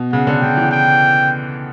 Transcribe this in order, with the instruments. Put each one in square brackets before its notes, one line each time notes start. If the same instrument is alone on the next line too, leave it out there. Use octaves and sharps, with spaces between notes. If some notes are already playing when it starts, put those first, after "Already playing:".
Already playing: [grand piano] B2
[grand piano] C#3 [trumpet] F#5
[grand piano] D3
[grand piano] C#3 [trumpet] G5
[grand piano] E3
[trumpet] G5